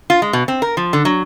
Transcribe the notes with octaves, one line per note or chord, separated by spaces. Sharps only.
F4
G#3
B2
C4
A#4
F3
D3
F#3